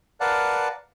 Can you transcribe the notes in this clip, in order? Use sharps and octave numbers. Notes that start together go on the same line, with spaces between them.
A#4 B4 D5 F5 F#5 A5